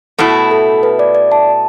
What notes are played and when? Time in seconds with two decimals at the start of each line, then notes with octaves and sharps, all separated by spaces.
0.19 B2 A3 E4 A4
0.51 A4
0.83 B4
0.99 D5
1.15 D5
1.32 A5